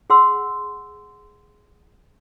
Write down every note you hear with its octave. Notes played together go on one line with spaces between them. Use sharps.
G#4 F#5 C6 E6